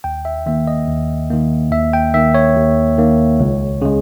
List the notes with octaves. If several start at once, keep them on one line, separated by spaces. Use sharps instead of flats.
D#2 G5
E5
D#3 A#3 E5
D#5
D#2
D#3 A#3
D#2 E5
G5
D#3 A#3 E5
C#5
D#2
D#3 A#3
C#2
C#3 G#3